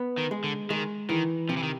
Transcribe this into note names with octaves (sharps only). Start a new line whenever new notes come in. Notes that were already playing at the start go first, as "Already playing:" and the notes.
Already playing: B3
D#3
G#3
D3
D#3 G#3
D#3 E3
C3 F3
E3
D#3